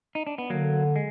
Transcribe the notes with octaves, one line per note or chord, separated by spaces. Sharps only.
D#4
D4
B3
D3 F#3 A#3
G#3